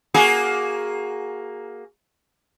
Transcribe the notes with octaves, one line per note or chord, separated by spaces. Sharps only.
A#3 F#4 G#4